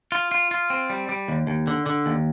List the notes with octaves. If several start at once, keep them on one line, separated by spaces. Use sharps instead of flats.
F4
F4
F4
C4
G3
G3
D#2
D#2
D3
D3
D#2